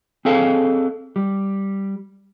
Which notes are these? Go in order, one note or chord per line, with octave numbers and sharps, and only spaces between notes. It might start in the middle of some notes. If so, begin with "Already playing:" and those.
C4 G#4 A4 C#5 F5
G3